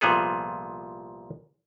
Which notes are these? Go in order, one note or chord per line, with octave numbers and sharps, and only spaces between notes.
C2 A#2 F3 B3 G#4 A4